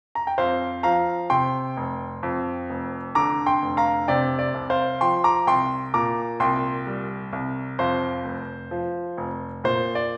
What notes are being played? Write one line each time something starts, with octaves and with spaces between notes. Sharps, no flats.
A#5
G5
F2 C5 F5
F3 F5 A#5
C3 G5 C6
F1
F2
F1
D3 A#5 D6
G5 C6
F1
F5 A#5
C3 D5 G5
D5
C2
C5 F5
F3 G5 C6
A#5 D6
C2 G5 C6
A#2 A#5 D6
C2 G5 C6
G3
C2
F2 C5 F5
F1
F3
F1
A#2 C5
D5